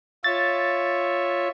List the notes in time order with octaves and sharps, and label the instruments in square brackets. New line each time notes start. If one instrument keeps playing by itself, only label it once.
[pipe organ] F4 C#5 E5 [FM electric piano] A6